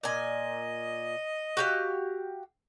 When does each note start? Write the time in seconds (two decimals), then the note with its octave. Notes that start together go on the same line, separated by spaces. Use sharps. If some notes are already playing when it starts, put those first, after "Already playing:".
0.03 A#2 D#5 G#5
1.57 F#4 G4 F5